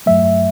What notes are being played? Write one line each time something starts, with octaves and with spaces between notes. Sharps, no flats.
G2 F#3 A3 E5